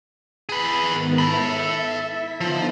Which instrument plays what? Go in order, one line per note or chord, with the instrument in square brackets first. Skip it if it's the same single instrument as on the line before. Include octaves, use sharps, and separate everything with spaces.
[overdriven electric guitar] G#4 B4 [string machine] A6
[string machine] G#2 D#3 B3
[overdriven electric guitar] A4 B5 [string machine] E5
[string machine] E4 B6
[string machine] D3 B3 D#4 [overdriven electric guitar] F3